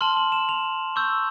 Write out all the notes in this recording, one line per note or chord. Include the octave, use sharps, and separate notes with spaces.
A5 C6 F6 F#7
F#7
E7
F7
C#6 E6 G6